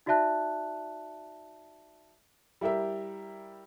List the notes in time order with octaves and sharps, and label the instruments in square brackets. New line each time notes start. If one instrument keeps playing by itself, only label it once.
[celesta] D#4 F#4 D5 E5 A5 F#6
[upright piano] G3 E4 G4 A#4 E5